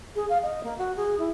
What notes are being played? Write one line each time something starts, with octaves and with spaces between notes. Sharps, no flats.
G#4
F5
D#5
A#3
F#4
G#4
E4